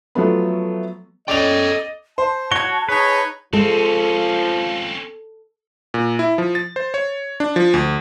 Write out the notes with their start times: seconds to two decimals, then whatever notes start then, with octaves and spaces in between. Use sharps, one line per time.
0.15 F3 F#3 A3 B3
1.28 C#4 A4 D5 D#5 G5 F7
2.18 C5 A5
2.52 F#4 C#5 G#6 G7
2.89 D#4 G#4 B4 C#5
3.53 F3 G#3 C4 C#4 A4
5.94 A#2
6.19 E4
6.38 F3
6.55 A6
6.76 C5
6.94 C#5
7.40 D4
7.56 F3
7.74 D2